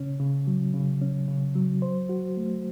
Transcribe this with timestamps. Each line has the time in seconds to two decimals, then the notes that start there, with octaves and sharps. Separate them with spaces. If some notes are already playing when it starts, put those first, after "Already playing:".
Already playing: C#3 C#4
0.20 C#3
0.47 F#3
0.74 C#3
1.01 C#4
1.28 C#3
1.55 F#3
1.82 C5
2.09 F#4
2.37 A3